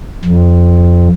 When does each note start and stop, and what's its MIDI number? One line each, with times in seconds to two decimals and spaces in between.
0.24 1.08 41